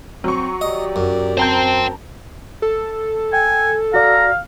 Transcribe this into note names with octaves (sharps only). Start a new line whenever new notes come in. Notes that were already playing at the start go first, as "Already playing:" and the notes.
F#3 C4 C#6
D#2 G4 D5 D#5
F#2
C4 C5 G5 A5 A#5 G6
A4
G5 G#5
F#4 D5 F5 A#5